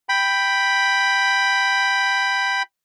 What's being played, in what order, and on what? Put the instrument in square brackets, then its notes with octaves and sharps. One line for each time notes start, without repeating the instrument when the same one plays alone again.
[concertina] G5 B5